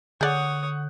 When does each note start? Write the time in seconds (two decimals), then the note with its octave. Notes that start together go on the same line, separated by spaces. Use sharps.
0.21 D3 G#4 C#5 D5 F#5 D#6 F#6 G6